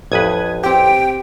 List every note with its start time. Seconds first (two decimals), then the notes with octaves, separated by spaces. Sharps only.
0.12 A1 F2 B4 D#6 G#6
0.63 C4 G4 G5